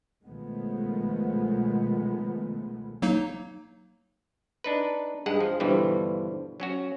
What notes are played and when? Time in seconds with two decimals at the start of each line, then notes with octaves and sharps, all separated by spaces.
0.25 B1 D#3 F3 G#3 A3 B3
3.02 F#3 A#3 D#4
4.64 D4 D#4 B4
5.26 G2 G#3 G#4 F#5
5.41 F3
5.60 G2 B2 D3 E3 F3 G3
6.60 F#3 C#4 F#4